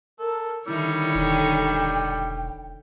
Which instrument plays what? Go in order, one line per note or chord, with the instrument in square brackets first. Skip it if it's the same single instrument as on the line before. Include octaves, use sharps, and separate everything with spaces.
[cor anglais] A4 [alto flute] A#4
[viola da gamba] D3 D#3 C#5 [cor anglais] G3 [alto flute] E4
[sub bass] E1 [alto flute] G5